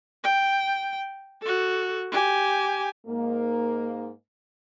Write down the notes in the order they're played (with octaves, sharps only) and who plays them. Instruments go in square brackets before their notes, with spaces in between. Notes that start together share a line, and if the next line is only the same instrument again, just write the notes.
[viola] G5
F#4 A4
G4 G#5
[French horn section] G#2 A#3